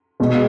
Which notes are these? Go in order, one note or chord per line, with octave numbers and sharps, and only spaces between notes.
B2 G#3